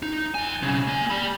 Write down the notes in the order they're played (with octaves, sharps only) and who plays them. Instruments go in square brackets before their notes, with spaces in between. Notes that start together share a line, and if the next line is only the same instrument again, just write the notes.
[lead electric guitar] D#4
F2 G#5
B1 C#3
A#3 G#5
G3 B5